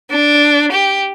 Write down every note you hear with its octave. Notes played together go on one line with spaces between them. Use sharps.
D4
G4